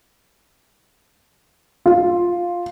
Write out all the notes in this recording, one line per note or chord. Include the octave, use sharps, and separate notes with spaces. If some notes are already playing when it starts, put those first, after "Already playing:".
F4